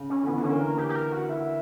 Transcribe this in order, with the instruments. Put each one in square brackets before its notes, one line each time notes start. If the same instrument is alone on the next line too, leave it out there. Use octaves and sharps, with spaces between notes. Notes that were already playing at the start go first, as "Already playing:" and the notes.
Already playing: [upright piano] C#3
[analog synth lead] C#4
[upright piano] D3
[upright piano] E3 [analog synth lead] B3
[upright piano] D3
[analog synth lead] C#4
[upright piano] A#3
[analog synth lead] A#4
G4
G4
A#4
F#4
E4